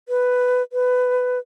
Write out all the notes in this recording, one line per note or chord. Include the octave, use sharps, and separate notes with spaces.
B4
B4